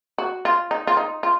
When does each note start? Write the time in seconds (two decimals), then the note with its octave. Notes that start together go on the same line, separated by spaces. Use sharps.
0.18 F#4
0.45 F4
0.71 D#4
0.87 F4
0.97 D#4
1.23 F4